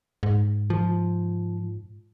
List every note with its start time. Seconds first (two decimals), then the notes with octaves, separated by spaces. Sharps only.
0.23 G#2
0.70 F3